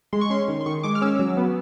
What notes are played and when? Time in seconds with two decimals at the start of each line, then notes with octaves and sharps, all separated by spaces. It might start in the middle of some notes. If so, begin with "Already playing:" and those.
0.13 G#3 C6
0.21 C#6
0.30 C#4 C6
0.48 D#3
0.61 C6
0.66 D#3 C#6
0.83 G#3 D6
0.95 F6
1.01 C#4 E6
1.19 F#3
1.37 B3